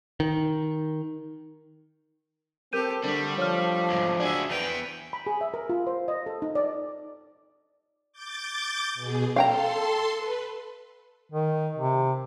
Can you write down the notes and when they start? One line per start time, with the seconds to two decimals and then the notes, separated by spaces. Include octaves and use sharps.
0.20 D#3
2.73 C4 G4 A4 A#4 G6 D#7
3.04 D3 G3 A3 D4
3.38 F3 C#5 F6
3.90 E2 G#2
4.20 D4 F#4 G#4 D5 E5
4.50 E2 B3 G5 F7
5.13 B5
5.27 G#4
5.41 E5
5.54 A#4
5.69 F4
5.87 C5
6.08 D#5
6.26 A4
6.42 D#4
6.55 D5
8.12 D6 G6 A6
8.95 B2 G#4
9.36 A4 F5 G5 A#5 C6
10.17 B4
11.32 D#3
11.76 C3